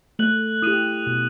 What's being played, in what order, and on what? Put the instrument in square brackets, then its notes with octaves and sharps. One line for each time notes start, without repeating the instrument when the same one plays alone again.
[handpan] A3 [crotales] F#6 F#7
[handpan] E4 G4 [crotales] D#6 D#7
[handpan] B2